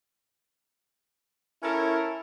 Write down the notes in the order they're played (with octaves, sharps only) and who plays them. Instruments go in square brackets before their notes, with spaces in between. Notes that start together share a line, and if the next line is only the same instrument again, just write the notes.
[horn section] C#4 E4 A4 A#4 C#5